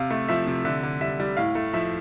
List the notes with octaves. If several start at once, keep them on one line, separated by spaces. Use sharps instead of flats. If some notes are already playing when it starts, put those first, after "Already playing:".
Already playing: C3 F5
A3
F3 E5
C3
D3 E5
D3
G3 E5
G3
A2 F5
A3
F3 E5